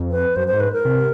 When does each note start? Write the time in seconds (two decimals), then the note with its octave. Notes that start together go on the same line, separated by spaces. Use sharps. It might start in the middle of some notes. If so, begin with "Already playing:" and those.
Already playing: F2
0.11 B4
0.36 F#2 C5
0.48 G#2 C5
0.60 B4
0.73 A#4
0.85 C3